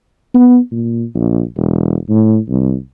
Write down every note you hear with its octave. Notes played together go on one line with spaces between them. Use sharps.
B3
A#2
A#1
E1
A2
C2